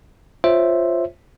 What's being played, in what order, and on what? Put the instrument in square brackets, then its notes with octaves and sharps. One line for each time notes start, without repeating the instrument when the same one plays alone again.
[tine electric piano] F4 C5 C#5 E5